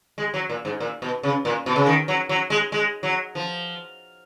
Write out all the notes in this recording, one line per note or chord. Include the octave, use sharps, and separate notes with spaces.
G#3
F#3
A#2
G#2
A#2
B2
C#3
A#2
B2
C#3
D#3
F#3
F#3
G#3
G#3
F#3
F3